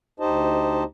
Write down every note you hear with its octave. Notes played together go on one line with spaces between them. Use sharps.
D2 D#4 G4 C5 D#5 A5